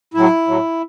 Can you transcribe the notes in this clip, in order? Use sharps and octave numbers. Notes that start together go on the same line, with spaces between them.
A2 F#3 E4
A2 F#3